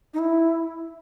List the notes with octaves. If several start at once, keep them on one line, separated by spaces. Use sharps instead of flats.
D#4
E4